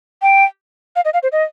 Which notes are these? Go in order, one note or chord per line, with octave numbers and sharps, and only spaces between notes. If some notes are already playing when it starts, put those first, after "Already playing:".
G5
F5
D#5
F5
C5
D#5